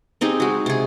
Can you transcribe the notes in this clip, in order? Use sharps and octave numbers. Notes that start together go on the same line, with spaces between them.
C4 D#4 G4 G#4
G#3 F#4
C3 G#4